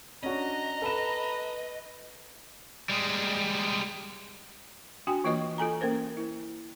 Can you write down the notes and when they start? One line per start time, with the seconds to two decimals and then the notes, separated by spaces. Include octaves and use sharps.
0.23 C#4 D4 F#4 D#5 A#5
0.82 A4 B4 B5 E7
2.89 G3 G#3
5.07 D4 F#4 G5 G#5
5.24 E3 A#3 F4 B4 D#5 C#6
5.58 F4 A4 G#5 A#5
5.81 A#3 C#4 A#4 C5
6.17 E4